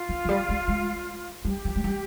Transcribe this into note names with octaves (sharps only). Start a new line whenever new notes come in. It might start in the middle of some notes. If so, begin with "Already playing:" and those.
Already playing: F4
F3
F3
G3
G#3
G#3
G3 G4
F3
G#3
G3